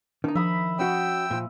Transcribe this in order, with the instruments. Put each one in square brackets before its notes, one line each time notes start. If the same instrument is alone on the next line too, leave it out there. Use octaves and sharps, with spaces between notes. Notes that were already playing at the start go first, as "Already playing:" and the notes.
[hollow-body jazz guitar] D#3 D#4 [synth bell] D4
[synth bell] F3 D#6 [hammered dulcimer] E5 B5
[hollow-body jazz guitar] C#4 F#4 [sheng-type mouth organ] G5 E6
[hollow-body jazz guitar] A#2 F3